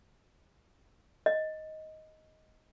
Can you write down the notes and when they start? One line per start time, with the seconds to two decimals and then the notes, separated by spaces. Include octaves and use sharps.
1.26 D#5